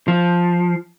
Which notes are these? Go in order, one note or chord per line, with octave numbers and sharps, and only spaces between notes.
F3